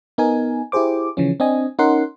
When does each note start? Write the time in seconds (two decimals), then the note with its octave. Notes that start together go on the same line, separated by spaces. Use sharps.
0.18 B3 D#4 A#4 G#5
0.72 E4 G4 G#4 C5 D6
1.17 C#3 E3 F3 C#4
1.40 C4 D4 D#5 G#5
1.79 C#4 D#4 A#4 F#5 C6